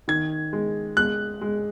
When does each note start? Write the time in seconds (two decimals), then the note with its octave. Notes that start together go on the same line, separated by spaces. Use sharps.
0.08 D#3 G#6
0.53 G#3
0.97 G#3 F#6
1.41 G#3